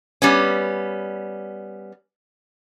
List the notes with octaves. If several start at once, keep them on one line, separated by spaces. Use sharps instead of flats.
G3 B3 C#4